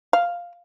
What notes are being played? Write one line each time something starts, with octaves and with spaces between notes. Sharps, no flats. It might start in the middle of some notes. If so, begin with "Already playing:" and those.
F5